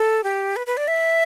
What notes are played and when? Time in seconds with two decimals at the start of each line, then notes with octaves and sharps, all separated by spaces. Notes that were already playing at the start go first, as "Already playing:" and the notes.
Already playing: A4
0.24 G4
0.56 B4
0.67 B4
0.77 D5
0.88 E5